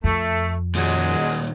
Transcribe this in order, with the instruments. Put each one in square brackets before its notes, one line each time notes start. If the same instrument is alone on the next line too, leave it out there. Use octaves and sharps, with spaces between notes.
[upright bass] F2 [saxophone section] A3
[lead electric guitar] D#2 A#2 [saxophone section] F#3 G#3